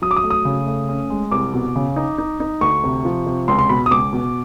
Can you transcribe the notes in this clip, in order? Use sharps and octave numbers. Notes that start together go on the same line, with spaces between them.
F#3 D#6
D6
D#6
A3
D#6
C#3
A3
C#4
G#3
C2 D6
B2
C#3
D#4
D#4
D#4
D2 C#6
C3
F3
C3
C#2 C6
C6
B2 B5
D#6
C#2 D6
B2